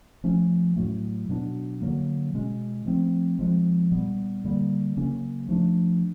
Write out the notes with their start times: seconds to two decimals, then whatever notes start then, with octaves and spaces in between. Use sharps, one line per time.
0.24 F3 A3 C#4
0.76 A2 F#3 A3
1.29 B2 F#3 B3 D4
1.82 D3 F#3 A#3
2.34 B2 G#3 C#4
2.86 F3 A3 C4
3.39 F3 G#3 C4
3.92 A#2 G3 B3
4.44 D3 G3 A#3
4.97 C#3 F#3 A#3 C#4
5.49 F3 A3 D4